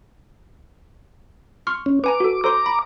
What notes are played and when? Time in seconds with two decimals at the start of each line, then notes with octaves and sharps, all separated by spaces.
1.67 C6 C#6 F6
1.86 C#4
2.04 B4 G#5 A#5 D6
2.20 F#4 A4
2.44 A4 C5 A#5 C6 D6
2.66 B5